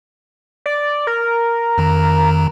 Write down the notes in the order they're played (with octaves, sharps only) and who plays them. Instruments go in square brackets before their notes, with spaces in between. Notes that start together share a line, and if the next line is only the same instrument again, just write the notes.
[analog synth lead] D5
A#4
[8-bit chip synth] F2 D#3 A#5